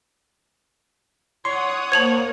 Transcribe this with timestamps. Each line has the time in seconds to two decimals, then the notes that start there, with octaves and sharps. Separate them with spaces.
1.45 C#5 F#5 C6 D#6
1.92 A#3 C5 A5 G#6 F7 F#7